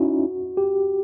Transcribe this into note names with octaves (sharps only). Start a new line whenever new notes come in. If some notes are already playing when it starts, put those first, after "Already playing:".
Already playing: C#4 D#4 E4 F#4
G4